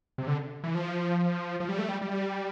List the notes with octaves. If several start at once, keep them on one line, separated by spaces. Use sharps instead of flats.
C3
D3
E3
F3
F3
G3
A3
G3
G3